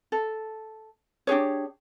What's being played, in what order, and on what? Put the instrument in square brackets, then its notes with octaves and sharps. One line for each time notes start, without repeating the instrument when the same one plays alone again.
[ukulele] A4
D4 G4 G#4 C#5